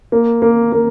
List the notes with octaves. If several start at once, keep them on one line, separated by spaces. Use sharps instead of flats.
A#3
A#3
A#3